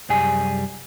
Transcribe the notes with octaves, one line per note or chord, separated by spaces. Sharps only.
C2 F#2 G3 G#4 G#5